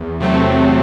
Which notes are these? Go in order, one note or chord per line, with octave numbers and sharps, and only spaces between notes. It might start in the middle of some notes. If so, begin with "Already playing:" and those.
Already playing: E2
C3 F#3 A3 C4
E2